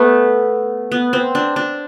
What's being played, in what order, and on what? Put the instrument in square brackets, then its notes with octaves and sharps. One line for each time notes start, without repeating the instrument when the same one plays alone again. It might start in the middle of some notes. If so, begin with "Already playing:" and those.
Already playing: [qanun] A3 B3
B3
C4
D4
D4